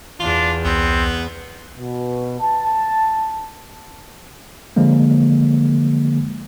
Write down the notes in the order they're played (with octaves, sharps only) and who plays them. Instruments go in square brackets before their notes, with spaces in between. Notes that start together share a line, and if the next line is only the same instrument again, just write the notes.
[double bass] E2 [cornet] D4 [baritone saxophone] F4
[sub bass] C2 [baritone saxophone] B3 [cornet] C4
[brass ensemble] B2
A5
[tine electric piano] D3 F3 G#3 A#3